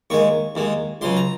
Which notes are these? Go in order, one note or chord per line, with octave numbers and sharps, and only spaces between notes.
D#2 D#3 G#3 C#6
D#2 D#3 G#3
C#2 C#3 F#3 C6
A#5